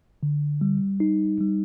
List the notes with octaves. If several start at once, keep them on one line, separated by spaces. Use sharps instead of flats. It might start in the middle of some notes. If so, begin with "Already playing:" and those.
D3
G3
D#4
G3